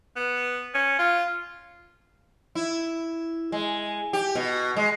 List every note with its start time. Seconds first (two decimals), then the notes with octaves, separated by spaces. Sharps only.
0.16 B3
0.74 C#4
0.99 F4
2.55 E4
3.52 G#3
4.13 G4
4.35 B2
4.76 G#3